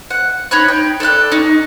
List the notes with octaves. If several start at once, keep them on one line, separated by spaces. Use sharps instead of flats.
F#5
D#4 C#5 B5 F#6
G5
A4 D5 F6 F#6
D#4 C#6